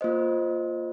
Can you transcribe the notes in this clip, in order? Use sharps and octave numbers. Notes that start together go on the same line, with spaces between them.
A#3 F4 C5 D#5